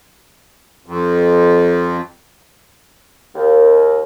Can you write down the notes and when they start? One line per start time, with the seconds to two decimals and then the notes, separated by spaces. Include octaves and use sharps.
0.86 F2
3.35 D#2